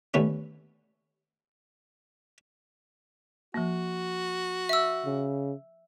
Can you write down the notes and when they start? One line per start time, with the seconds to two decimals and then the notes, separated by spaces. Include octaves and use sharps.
0.14 D#2 D3 A3 B3 C#4
3.54 F3 A#3 F#4
4.69 E5 E6
5.06 C#3